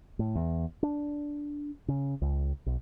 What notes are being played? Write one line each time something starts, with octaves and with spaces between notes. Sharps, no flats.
A2
E2
D4
C#3
C#2
B1